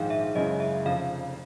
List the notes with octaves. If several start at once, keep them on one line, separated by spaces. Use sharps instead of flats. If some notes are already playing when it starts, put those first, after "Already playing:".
Already playing: A#1 G#2 D#3 G#3 F5
E5
F#1 F#2 C#3 E3 G#3 D#5
E5
F1 F2 C#3 F5